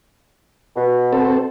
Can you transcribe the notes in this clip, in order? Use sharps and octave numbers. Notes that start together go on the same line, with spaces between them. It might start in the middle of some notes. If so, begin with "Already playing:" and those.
B2
C4 A4